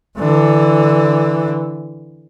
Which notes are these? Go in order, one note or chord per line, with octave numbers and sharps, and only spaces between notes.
D3 E3